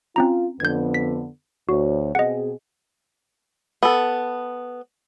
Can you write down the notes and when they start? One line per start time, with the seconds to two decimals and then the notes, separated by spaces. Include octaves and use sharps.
0.16 C4 C#4 F4 A#5
0.60 F2 D3 B3 G6 G#6
0.94 B6
1.69 D2 F#4 C#5
2.15 B2 C4 G#4 D#5 F#5
3.83 B3 A4